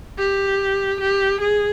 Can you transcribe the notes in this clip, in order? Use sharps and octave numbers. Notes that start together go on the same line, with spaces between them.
G4
G4
G#4